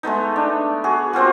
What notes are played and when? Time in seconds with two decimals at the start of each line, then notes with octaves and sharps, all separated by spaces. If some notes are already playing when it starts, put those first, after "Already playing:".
0.03 G#3 A3 B3 D#4
0.36 D4
0.84 F#4 G#4
1.13 A#3 C4 F4 F#4